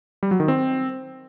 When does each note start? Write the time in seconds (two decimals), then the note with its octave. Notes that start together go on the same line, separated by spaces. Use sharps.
0.23 G3
0.31 F#3
0.40 D#3
0.48 C4